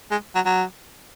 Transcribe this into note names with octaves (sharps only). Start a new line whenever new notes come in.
G#3
F#3
F#3